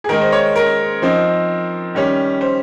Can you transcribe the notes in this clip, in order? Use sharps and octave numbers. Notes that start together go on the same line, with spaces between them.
G#4
D#3 G#3 D#4 A#4
C5
C#5
A#4
F3 C4 D#4
D#3 G3 C#4
C5